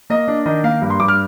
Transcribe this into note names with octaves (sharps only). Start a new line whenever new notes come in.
A#3 D#5
D4
D#3 D#5
A#3 F5
G2
C6
G2 D6
F6